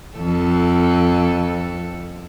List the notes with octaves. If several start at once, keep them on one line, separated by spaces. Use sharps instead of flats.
F2 A4